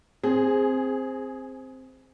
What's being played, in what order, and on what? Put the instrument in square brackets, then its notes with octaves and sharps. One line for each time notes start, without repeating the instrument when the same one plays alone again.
[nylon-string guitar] C4 [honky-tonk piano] G#4